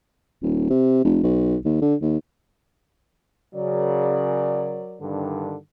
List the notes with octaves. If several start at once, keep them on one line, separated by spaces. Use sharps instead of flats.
D#1
C3
F1
B1
D#2
D3
D#2
C#3 F#3 A#4 D5
G2 D3 D#3